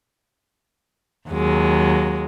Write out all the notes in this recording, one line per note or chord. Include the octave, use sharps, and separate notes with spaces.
D#2 F#3 G#3